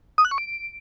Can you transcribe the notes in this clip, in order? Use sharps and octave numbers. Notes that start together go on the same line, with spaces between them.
D#6
F#6
C#6
D7